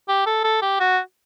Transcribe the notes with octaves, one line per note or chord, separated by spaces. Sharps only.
G4
A4
A4
G4
F#4